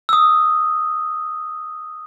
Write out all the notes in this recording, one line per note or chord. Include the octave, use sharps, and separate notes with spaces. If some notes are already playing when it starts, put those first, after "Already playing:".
D#6 E6